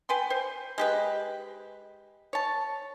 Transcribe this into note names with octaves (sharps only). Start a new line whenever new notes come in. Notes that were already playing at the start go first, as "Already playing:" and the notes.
B4 G5 G#5 C6
C5
G#3 G4 B4
C#5 A5